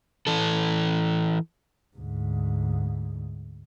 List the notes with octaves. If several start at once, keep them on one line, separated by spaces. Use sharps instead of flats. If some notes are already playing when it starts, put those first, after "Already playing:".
E3 A4
D2 G#2